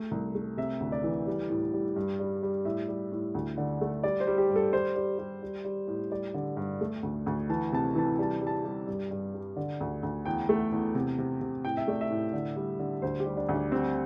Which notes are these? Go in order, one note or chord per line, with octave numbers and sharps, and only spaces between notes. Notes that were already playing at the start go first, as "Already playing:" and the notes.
Already playing: A3
C2
A3
C3 E5
D2
D5
E3
G3
A2
G3
G2
G3
G3
A2 E5
G3
A2
D2
D3
A3
G3 D5
C5
G3
G4
G2
A4
G3 C5
G3
G3
G3
G3
A2
G3 D5
D3
G2
A3
D2
D2
E3 A5
C3 A5
E3 A5
G3 A5
G3
A5
G3
G2
G2
G3
D3
D2
D2
E2 G5
A3
E2
C3
C3
C3
A2 G5
E5
A3 D5
E5
A2
D3
G3
D3
D2 C5
G4
G3
D4
D2
D4
G3 C4